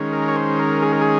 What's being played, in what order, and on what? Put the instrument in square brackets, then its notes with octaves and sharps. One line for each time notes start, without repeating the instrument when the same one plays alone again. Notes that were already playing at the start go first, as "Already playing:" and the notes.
Already playing: [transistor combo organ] D#3 G#3 C#4
A#4
C#5
C5
A#4
G#4
A#4
G#4